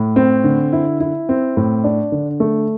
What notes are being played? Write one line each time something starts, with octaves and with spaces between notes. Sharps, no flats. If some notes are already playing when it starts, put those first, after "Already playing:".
Already playing: A2
C4
D3
E4
E4
C4
A2
D4
D3
A3